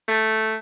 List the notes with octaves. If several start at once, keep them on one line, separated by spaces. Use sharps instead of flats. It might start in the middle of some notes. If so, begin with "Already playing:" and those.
A3